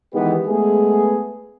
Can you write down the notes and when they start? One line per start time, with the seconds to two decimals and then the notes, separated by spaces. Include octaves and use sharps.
0.14 D#3 E3 G#3 B3 G4 B4
0.47 G#3 A3 B3 G#4